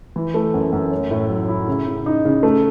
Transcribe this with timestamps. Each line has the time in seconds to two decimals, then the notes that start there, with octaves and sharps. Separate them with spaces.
0.16 E3
0.34 A3
0.54 F#2
0.73 F#2
0.91 C#4
1.11 A2
1.29 F#3
1.48 E4
1.68 C#3
1.86 C#3
2.06 D#4
2.25 C#3
2.43 A3